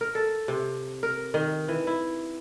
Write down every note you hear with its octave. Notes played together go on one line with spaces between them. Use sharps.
A#4
A4
C3
A#4
D#3
E3
E4